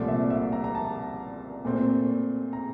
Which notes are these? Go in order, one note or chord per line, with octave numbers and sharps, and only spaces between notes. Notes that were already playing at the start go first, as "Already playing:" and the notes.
Already playing: C2 A#2 F3 A3 D5
E5
E5
A#5
A#5
A5
A#2 A3 C4
A#5